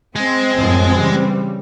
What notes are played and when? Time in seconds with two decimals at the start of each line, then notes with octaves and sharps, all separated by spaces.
0.16 G#3 C4
0.56 F#2 A2 F3
0.92 C#3 E3 G3